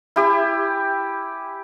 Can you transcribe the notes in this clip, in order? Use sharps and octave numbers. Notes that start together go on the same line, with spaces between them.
E4 G4 G#5